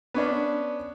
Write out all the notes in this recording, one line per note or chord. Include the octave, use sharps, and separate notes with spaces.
B3 C#4 D4